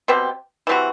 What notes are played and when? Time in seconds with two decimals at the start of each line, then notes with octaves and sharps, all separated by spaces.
0.08 B2 G3 C4 G4
0.67 E3 G3 C4 F#4